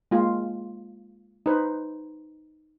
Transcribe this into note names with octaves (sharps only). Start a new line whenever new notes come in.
G#3 A#3 F4
D#4 B4 C5